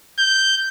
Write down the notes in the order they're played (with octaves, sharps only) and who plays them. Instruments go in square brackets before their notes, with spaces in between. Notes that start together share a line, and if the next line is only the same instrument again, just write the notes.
[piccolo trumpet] G6